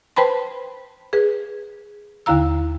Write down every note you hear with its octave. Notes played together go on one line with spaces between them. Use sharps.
B4 C5 G5 A5 B5 C6
G#4 B4
D#2 D3 E4 F5 A#5 E6